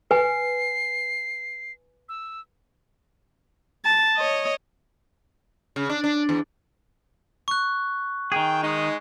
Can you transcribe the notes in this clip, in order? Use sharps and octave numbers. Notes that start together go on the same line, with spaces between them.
B4 G#5 C7
E6
A5
C#5 D#5
C#3
D4
D4
E2
C#6 F#6
D#3 G#4 G5
G#3 D#4